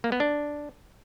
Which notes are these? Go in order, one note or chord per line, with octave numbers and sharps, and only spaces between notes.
A#3
B3
D4